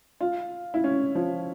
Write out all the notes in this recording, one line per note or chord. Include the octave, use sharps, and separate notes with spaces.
F4
E4
C#4
F3